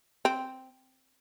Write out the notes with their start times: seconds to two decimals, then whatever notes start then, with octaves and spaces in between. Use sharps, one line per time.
0.25 C4